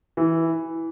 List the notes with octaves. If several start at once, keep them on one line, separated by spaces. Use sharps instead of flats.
E3